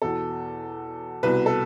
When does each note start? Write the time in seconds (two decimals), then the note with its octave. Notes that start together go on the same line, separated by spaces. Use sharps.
0.02 E2 B2 A4
1.23 C2 B2 B4
1.46 A4